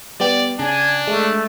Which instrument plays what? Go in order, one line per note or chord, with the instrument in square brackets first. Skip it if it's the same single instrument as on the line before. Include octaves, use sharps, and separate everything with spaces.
[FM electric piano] G3 B3 G4 [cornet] D5
[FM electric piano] C#3 [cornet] D4 [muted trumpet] G#5
[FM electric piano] G#3 [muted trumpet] A3